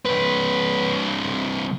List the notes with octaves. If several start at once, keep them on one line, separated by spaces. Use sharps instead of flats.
C2 B4